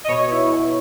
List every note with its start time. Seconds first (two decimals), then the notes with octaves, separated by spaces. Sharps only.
0.04 D#5
0.08 B2 C#5
0.31 E4
0.53 B2